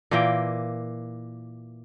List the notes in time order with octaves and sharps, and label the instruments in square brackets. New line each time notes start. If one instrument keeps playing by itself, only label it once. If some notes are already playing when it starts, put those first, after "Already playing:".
[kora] A#2 E3 A#3 G5